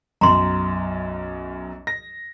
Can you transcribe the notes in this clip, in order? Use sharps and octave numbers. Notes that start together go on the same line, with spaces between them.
B1 F#2 A#5 C6
A#6